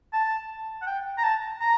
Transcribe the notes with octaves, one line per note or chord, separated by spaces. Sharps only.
A5
F#5
G5
A#5
A5
A#5